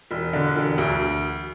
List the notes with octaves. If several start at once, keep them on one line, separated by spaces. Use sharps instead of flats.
E1
D3
E1
D2